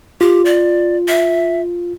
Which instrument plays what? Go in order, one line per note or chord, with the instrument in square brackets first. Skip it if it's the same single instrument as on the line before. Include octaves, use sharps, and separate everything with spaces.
[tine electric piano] F4 [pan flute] G4
[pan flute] D5
E5